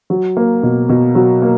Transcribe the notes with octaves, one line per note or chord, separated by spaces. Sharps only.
F#3
A#3
B2
B2
F#3
A#3